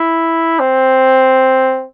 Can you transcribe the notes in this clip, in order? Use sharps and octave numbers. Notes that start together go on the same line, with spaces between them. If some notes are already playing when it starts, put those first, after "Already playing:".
Already playing: E4
C4